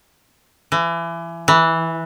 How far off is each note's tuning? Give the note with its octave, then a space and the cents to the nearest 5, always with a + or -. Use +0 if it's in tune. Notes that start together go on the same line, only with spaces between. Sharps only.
E3 +30
E3 -10